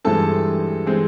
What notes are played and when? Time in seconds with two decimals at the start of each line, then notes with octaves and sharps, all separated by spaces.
0.04 G2 E3 G#3 C4 A4 A5
0.86 E3 G#3 C4